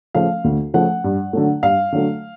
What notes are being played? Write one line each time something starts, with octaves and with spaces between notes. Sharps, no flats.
C#3 F3 A3 F5
D2
C#3 F3 A3 F#5
G2
D3 F#3 A3
G2 F5
D3 F#3 A3